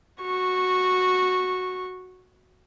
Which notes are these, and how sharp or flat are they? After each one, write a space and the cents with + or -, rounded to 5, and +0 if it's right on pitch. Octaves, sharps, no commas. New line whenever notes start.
F#4 -5 C#6 -10